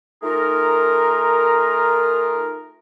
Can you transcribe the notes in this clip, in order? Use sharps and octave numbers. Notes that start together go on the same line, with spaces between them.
A3 D#4 F4 G#4 A#4